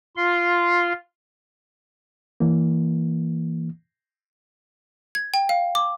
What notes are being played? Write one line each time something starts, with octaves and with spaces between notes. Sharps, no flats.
F4 C6
E3 A#3
G#6
G5
F5
D6